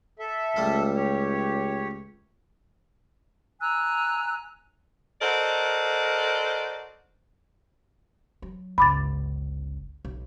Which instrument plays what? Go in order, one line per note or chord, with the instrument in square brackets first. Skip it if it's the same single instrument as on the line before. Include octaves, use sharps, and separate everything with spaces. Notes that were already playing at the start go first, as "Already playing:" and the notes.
[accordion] A4 E5
[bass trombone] C#2 [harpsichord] G3 A3 F4
[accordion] G4 C#5
[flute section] G#5 A#5 E6 F#6
[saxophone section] F#4 A4 A#4 C5 D5 D#5
[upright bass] F#3
[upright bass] G1 C#2 [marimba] B5 D6 A6
[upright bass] B1